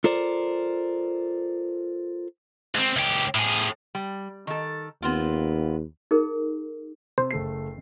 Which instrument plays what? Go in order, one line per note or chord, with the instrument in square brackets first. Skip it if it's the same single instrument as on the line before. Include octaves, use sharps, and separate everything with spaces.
[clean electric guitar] F4 A4 A#4 C5 D5
[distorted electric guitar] G#2 C4
C#2 G4
A2 G#4
[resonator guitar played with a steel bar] G3
D#3 A4
[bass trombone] D#2 [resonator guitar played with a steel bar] B3 C4 F4
[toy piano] D#4 G#4 A#4
[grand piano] C3 [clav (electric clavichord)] C5
[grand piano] F#1 A3 C7